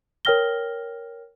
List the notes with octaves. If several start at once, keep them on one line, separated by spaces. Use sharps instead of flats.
A#4 C#5 G5 F6 A#6 G7